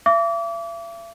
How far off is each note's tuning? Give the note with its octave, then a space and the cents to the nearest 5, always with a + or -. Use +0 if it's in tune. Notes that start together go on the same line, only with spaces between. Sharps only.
E5 +40 D6 -35